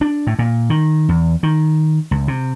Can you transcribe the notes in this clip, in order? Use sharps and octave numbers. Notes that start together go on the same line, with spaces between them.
D4
A2
A#2
D#3
E2
D#3
C#2
C3